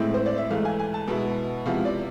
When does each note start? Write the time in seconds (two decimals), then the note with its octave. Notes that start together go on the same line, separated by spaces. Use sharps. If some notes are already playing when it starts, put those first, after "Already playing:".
Already playing: A2 G#3 C4 E4
0.14 C5
0.26 D5
0.38 E5
0.50 G#2 E3 A3 F5
0.65 G#5
0.80 G#5
0.94 A5
1.08 B2 G#3 B3 E4
1.66 C3 F3 G#3 B3 E4 F5
1.85 D5